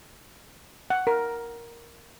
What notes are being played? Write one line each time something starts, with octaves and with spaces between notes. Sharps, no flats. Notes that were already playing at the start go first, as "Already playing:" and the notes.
F#5
A#4